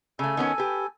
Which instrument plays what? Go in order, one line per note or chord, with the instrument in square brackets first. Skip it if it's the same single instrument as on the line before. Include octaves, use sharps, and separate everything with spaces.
[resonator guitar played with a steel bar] C#3 A3 [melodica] A4 G#5
[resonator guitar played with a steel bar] D#3 B3 C#4
G4 B4